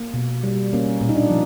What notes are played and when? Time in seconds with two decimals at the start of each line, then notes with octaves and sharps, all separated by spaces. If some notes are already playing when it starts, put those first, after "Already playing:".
Already playing: A#3
0.14 B2
0.43 G3
0.73 A#3 C#4
1.01 A#2
1.09 D#4
1.16 D4
1.30 F3